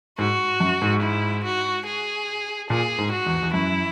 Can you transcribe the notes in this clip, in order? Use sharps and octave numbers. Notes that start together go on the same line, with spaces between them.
G#2 F#4
F#2
G#2
E4
F#4
G#4
A#2 G#4
G#2
F#4
E2
E2
F#2 E4